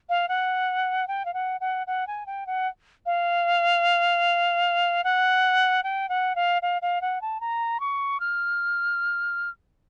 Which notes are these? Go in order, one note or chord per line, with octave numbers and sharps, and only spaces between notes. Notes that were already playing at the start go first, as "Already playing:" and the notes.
F5
F#5
G5
F5
F#5
F#5
F#5
G#5
G5
F#5
F5
F#5
G5
F#5
F5
F5
F5
F#5
A5
A#5
C#6
F6